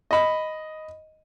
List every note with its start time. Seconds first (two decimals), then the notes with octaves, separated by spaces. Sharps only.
0.11 D#5 B5